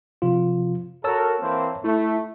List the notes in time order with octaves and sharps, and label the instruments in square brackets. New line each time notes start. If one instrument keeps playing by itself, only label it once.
[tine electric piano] C3 F3 F4
[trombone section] F#4 A4 A#4 [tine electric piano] C#5 A5 E6
[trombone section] E3 A#3 C4
[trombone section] A3 [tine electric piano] E4